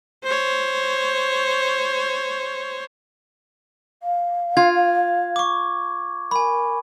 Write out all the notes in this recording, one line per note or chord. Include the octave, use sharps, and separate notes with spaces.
C5 C#5
F5
F4 G#6
C#6 D6
A#4 G#5 B5